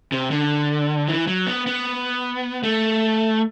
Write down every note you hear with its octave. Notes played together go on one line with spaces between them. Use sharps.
C3
D3
E3
F#3
B3
B3
A3